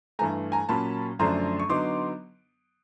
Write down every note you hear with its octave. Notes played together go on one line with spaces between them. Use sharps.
G2 E3 A3 G#5 A#5
G#5 A#5
A#2 F#3 A#3 C#4 A5 B5
F#2 D3 F3 A3 D4 A#5 C6
C#6
D3 F#3 B3 D#4 C6 D6